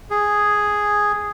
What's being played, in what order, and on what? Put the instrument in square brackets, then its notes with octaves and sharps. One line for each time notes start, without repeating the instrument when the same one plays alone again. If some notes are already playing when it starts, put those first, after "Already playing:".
[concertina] G#4